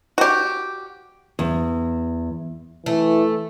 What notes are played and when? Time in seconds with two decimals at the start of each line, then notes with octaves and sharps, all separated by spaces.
0.18 F#4 G4
1.39 E2
2.86 E3 A3